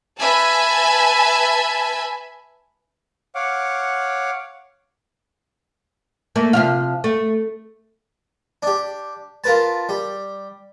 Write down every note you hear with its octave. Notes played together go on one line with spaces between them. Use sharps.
B4 E5 G#5 A5
C#5 F5 F#5 D6
A3 A#3
C3 F3 F5
A3
D4 G4
F4 A#4 B4 A5
G3